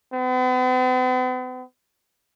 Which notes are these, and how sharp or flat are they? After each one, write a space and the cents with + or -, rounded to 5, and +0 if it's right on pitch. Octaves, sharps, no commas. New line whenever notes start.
B3 +45